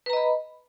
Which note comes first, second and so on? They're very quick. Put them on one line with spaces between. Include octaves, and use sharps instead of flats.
B4 A#5 D#5 B5